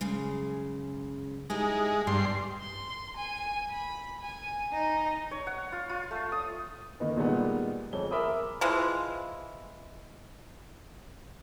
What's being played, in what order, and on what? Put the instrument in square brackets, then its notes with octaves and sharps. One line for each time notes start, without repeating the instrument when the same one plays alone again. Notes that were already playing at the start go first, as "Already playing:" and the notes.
[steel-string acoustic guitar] F#2 C#3 G#3
[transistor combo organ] G#3 [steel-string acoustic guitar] D#4 E4 G4
[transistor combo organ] G2 C6 [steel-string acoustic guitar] B2
[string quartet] C6
G#5
B5
G#5
D#4
[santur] C#5
F#5
F4
F4
A3
D#6
[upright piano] D#3 A#3 D#4 B4
A#2 D#3 G3 G#3 B3
F2 G#3 C#5 G7
G#4 A#4 E5 B5 D6 D#6
[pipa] E3 F3 G#3